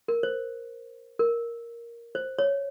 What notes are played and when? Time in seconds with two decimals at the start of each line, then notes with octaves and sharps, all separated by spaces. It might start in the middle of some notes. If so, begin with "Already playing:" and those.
0.08 A#4
0.23 C5
1.19 A#4
2.15 C5
2.39 C#5